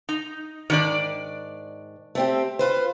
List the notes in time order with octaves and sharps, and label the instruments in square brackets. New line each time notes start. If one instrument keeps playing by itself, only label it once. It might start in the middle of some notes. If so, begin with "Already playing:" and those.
[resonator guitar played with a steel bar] D#4
[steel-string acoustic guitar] G#2 [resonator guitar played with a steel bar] D#3 D4 D5
[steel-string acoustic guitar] A3 C4 G4
F4 B4 C5